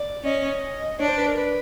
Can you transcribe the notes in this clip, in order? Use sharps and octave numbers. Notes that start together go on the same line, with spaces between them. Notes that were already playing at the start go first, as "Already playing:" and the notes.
Already playing: D5
C#4 D#5
D4 C#5
C5
B4
A#4
B4